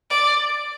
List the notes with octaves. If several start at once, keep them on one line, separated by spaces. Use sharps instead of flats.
D5